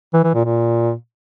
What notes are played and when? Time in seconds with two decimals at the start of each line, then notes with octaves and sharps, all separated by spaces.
0.14 E3
0.24 E3
0.34 A#2
0.44 A#2